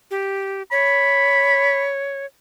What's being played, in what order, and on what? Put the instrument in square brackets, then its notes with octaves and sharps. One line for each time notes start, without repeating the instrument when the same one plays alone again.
[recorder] G4
[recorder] C#5 [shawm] B5